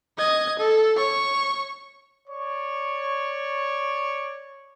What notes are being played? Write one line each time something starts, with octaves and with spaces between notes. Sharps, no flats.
D#5 G#6
A4
C#5 C#6
C#5 D5 C#6